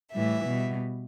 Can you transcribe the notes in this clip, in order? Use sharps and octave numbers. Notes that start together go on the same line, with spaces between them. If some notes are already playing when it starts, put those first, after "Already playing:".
A2 E3 G3 E5
B2 G3